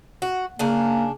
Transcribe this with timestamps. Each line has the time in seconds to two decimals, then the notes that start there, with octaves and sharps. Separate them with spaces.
0.22 F#4
0.59 C#3 A#3 D4 G#5